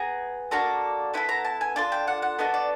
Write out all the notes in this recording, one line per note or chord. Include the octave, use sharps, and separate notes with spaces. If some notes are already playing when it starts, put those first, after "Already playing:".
Already playing: B3 G#4 A#5
A#3 D4 F#4 A4 A#5
B3 E4 A4 B5
A#5
A5
G#5
D4 F4 A4 A5
G5
F#5
F#5
B3 D4 F#4 A4 D#5
D5